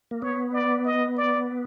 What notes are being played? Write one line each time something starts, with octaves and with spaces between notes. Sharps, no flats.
A#3
B3 C#5
D5
D#5
D5